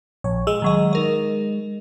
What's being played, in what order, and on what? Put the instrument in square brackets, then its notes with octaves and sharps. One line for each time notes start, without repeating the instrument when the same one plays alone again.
[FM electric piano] A#1 C#5
[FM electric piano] G#3 [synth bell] E6
[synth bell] D#3 F#3 D#5
D#4 A#4 D#5